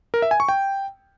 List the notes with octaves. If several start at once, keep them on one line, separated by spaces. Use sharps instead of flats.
A#4
E5
G#5
C#6
G5